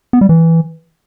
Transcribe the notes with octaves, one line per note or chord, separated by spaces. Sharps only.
B3
G3
E3